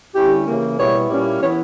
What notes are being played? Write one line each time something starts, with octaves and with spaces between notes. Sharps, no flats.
D3 G3 C#4 E4 G4
C#3 E3 A#3
B2 G3 B3 E4 C#5
A#2 G3 A#3 C#4 E4
E3 B3 E4 C#5